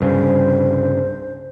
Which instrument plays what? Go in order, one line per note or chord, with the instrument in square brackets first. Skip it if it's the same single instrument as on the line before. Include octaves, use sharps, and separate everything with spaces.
[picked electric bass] C2 G2 C#3 [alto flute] C5